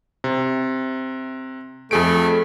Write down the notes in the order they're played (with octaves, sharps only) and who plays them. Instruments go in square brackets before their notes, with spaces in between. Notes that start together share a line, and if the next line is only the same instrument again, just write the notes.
[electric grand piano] C3
[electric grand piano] F2 G#4 D7 [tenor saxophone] A3